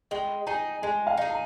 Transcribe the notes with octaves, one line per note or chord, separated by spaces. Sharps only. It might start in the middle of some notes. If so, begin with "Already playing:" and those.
G#3 G5
D#4 G#4 G#5
G#3 G#5
F5
D#4 G#4
A#5